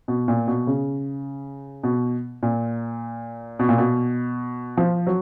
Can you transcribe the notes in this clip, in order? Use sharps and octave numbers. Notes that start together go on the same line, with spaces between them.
B2
A#2
B2
C#3
B2
A#2
B2
A#2
B2
F3
F#3